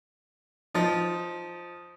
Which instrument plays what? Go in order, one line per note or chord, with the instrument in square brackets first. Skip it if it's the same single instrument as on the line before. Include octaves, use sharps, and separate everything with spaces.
[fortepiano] F3 D#4